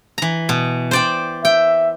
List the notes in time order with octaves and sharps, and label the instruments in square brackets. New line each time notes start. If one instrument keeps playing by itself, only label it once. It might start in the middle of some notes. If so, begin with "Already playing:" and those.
[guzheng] E3 A#5
B2
C5 D5 G5
[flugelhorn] E5 [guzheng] G5